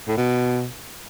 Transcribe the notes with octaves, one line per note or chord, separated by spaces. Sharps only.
A2
B2